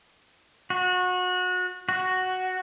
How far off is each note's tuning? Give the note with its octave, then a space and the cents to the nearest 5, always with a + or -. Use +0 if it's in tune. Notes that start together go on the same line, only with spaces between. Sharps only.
F#4 -25
F#4 +5